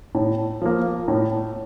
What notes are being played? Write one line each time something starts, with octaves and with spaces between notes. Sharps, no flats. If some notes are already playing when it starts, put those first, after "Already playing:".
A2
F3 A#3
A2